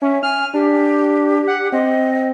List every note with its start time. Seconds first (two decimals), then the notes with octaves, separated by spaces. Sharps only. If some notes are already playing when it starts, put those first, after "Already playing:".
0.02 C#4 E5
0.23 G#5 F6
0.54 D4 G4
1.47 F#5
1.72 C4 D#5